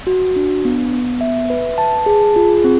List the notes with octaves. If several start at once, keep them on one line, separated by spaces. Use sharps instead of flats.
F#4
D4
B3
B3
E5
B4
A5
G#4
F4
C4